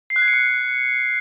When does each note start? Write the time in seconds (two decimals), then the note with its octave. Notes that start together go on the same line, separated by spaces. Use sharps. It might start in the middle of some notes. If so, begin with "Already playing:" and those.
0.10 C7
0.16 F#6
0.22 G#6
0.28 C#7
0.34 F#6